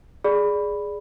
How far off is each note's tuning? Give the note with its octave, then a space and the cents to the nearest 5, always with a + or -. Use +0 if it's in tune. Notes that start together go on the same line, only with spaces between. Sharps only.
G#4 +0 D5 +0 B5 +0